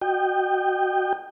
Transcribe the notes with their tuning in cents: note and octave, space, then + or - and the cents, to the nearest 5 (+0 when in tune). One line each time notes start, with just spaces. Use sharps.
F#4 +5 D#5 -25 G5 +0